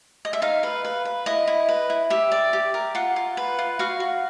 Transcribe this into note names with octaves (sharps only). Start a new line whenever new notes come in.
D#5
E5
D#4 F5
B4
B4
B4
E4 D#5
E4
B4
E4
G4 E5
D5
G4
A#4
F4 F#5
F4
B4
F4
F#4 F5
F#4